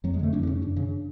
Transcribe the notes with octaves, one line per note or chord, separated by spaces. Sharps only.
F2 F#3
G#3
D3 A3
F2 D4
D4
C#3 C#4
F#2 D4
C#3